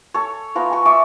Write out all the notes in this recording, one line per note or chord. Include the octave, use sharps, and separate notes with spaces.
A4 C#5
F3 B3 A#5
G#5 C#6
D5 E5 C6 C#6